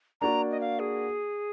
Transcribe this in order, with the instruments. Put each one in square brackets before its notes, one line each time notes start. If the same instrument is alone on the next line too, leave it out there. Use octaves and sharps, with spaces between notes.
[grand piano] A#3 D4 F#4 D5 [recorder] A#5
[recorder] D#5
F5
G#4